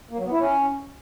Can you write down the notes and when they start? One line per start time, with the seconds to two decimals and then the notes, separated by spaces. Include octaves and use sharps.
0.11 A#3
0.18 F#3
0.25 B3
0.32 E4
0.39 C#4